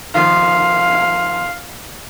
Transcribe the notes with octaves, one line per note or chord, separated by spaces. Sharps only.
D#3 F3 F5